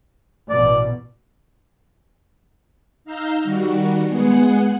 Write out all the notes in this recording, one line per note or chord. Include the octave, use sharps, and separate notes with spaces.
A1 B2 D5
D#4 F5 A#5 E6 G6
D#3 G3 F#4
G#3 B3 G#4 F#5